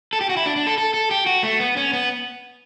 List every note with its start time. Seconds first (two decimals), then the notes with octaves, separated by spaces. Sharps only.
0.13 A4
0.21 G4
0.29 F#4
0.37 E4
0.46 D4
0.56 D4
0.67 A4
0.78 A4
0.94 A4
1.11 G4
1.26 F#4
1.43 A3
1.60 B3
1.77 C#4
1.93 B3